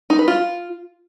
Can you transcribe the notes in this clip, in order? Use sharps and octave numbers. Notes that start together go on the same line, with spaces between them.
D#4
B4
F4